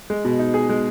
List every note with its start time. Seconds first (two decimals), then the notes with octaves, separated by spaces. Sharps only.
0.10 G#3
0.25 B2
0.39 D#4
0.54 G#4
0.69 G#3